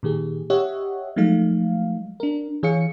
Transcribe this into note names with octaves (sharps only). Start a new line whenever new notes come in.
A#2 D#3 G4 G#4
G4 C#5 D#5 E5 F#5
F3 F#3 G#3 A3 D#4 F5
D4 A#4
E3 G#4 C#5 F5 C#7